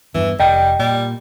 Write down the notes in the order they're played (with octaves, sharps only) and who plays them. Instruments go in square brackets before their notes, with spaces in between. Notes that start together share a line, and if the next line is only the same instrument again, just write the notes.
[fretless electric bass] E2 G2 [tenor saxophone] E3
[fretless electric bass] F1 [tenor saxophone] G3 [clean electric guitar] D#5 G5
[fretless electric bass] A#2 [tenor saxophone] G3